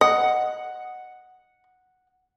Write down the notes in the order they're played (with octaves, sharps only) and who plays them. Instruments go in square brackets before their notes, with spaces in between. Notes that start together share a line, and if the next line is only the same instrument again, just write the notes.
[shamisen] D#5 [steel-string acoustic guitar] F#5